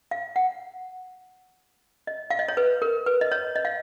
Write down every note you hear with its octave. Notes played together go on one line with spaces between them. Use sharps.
F5
F#5
D#5
F5
D#5
C#5
B4
A#4
B4
D#5
C#5
D#5
F5